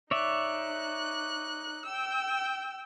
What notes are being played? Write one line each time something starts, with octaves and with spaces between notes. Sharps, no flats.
D#4 C#5 D5 E5 F#6
G5 E6